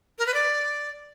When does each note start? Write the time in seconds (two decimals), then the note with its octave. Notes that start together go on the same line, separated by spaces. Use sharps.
0.19 A#4
0.26 B4
0.34 D5